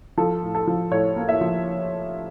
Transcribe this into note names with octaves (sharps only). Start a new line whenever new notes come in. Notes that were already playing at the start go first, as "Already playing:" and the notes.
F3 A4
A2
A4
F3
A2 C#5
A#3
E5
F3